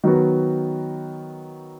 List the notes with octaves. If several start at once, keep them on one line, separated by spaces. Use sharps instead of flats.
D#3 F#3 B3 F#4